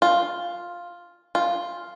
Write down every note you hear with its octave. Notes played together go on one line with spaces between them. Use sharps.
F4
F4